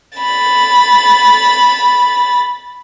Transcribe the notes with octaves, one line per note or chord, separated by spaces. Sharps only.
B5 A6